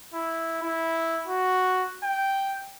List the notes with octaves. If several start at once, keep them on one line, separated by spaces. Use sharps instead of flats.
E4
E4
F#4
G5